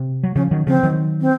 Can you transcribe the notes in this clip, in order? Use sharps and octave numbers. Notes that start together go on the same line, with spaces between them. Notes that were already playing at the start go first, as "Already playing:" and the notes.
Already playing: C3
F#3
C#3 F3 C#4
D#3 F#3
C#3 F3 C4
D#3 F#3
C4